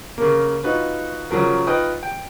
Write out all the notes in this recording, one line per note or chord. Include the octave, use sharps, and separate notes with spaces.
C#3 A#3
D#4 F4 F#4 B4
C#3 F3 F#3 A#4
D#4 F4 B4 D#5 F5 G5
G5